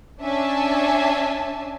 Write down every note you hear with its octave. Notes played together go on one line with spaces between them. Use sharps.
C#4 D4 E5 G#5 A5